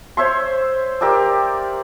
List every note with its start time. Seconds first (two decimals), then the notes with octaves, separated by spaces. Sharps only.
0.17 C5 C#5 E5 C6
1.01 G4 A#4 D5 E6